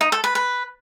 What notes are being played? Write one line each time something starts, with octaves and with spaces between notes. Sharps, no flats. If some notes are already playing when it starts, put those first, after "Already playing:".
D#4
A4
B4
B4